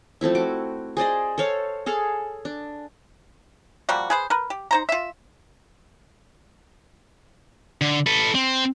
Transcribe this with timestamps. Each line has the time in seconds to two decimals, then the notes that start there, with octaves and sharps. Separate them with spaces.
0.21 F3 A3 C4 E4
0.35 F#4 D6
0.97 G#4 C5 D5 D#5
1.38 A4 C5 C#5 F5
1.86 G#4 A4 F5
2.45 D4
3.89 F3 G3 A#3 F#4
4.10 G#4 B4 C5
4.30 A#4 B4
4.50 G4
4.71 D#4 C5 A#5
4.89 F4 E5
7.81 D3
8.06 A4 B4
8.35 C4